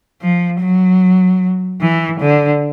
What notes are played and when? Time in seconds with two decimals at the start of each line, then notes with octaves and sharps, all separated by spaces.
0.22 F3
0.61 F#3
1.81 E3
2.21 D3